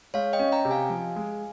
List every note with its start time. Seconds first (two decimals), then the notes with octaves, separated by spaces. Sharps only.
0.14 G#3 C#5 F5
0.33 D#5 G5
0.39 C#4
0.52 G5 A#5
0.65 C3
0.71 F5 G#5
0.90 F3
1.16 G#3